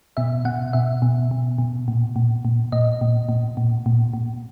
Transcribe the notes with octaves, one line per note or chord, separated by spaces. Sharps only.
B2 E5
B2 F#5
B2 E5
B2
B2
B2
A#2
A#2
A#2
A#2 D#5
A#2
A#2
A#2
A#2
A#2